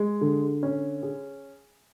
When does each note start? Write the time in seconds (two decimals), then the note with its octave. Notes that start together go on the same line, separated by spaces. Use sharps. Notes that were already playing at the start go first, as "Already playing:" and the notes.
Already playing: G#3
0.21 D3
0.63 C#4
1.03 G#4